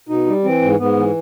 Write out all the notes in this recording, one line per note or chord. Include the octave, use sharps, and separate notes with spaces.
B2 D#4
G3
E3 C4
G#2
G#2 B3
E3